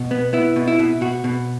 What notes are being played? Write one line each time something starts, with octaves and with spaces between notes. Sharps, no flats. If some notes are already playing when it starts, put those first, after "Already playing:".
Already playing: B2
B3
B3 E4
B2
E4
B2
B2 F#4
B2